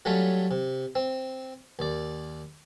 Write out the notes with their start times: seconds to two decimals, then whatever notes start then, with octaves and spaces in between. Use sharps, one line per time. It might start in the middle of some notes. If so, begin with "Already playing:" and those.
0.05 F#3 G3 A3 C#4 F4
0.51 C3
0.95 C4
1.79 D#2 D5